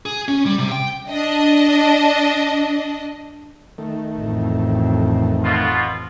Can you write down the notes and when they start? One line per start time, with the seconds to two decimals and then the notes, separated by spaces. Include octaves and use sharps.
0.06 G#4
0.28 C#4
0.45 G3
0.58 C3
0.71 G5
1.09 D4 D#5
3.78 D#3 A3
4.16 A1 F2
5.43 B2 F4